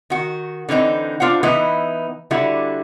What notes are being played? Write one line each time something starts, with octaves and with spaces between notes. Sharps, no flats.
D#3 F#4
D3 E3 C4 D#4
D4 F4 C5 F#5
E3 B3 D#4 E4
D3 G3 E4 F#4